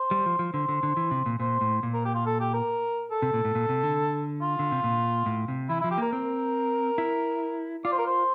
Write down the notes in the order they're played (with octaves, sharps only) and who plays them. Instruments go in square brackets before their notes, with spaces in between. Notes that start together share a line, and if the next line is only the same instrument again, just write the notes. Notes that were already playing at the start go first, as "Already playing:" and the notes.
Already playing: [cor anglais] C5
[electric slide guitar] G3
F3
F3
[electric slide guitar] D3 [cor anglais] C5
[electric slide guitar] D3
D3
E3
C3
A#2
[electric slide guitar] A#2 [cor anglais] C5
[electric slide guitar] A2
A#2
[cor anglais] A#4
G4
F4
A4
G4
A#4
A4
[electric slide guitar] C3
A#2
A2
A#2
C3
D3
[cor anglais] F4
[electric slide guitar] D3
C3
A#2
A2
C3
[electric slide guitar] E3 [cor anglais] E4
[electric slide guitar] F3 [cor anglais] E4
[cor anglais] G4
[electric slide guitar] A#3 [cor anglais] A#4
[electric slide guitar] C4 [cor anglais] A#4
[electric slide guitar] E4
[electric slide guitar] F4 [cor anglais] D5
[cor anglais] C5
A#4
C5